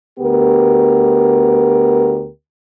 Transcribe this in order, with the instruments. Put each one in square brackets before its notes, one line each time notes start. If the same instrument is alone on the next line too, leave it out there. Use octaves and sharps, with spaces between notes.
[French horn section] D2 B3 G4 A#4